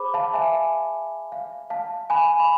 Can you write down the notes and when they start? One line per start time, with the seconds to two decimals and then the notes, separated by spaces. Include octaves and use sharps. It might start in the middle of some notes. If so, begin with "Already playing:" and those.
Already playing: G#4 C5 B5 D6
0.14 F5 A5
0.34 E5 G#5
1.32 F5
1.70 F5 A5
2.10 G#5 B5
2.40 B5